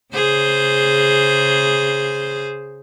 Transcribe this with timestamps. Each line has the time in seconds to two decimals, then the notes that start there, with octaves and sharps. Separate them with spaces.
0.14 C#3 G#4 C5